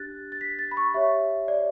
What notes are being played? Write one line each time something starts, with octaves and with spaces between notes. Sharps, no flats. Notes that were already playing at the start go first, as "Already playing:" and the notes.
Already playing: D4 G4 F#6 A6
A6
B6
A6
B5
C#6
G4 C#5 E5
D5